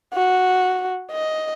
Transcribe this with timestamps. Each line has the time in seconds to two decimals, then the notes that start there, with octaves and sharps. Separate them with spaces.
0.14 F#4
1.11 D#5